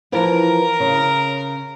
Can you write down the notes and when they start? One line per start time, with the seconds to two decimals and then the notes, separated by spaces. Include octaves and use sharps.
0.12 E3 F3 A#4
0.80 C#3